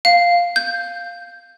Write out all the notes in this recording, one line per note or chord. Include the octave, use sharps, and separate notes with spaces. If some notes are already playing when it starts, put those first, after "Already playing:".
F5
G6